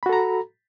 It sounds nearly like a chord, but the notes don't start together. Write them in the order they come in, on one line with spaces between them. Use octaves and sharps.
B5 F#4 A4 A#5